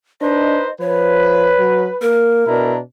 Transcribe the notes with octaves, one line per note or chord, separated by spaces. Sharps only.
D4 D#4 B4 C5 D#5
F3 B4 C#5
F#3
A#3 A#4
B2 D4 E4 A#5